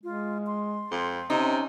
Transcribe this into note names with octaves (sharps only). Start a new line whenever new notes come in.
G#3 F4
C6
F2
C3 C#4 D#4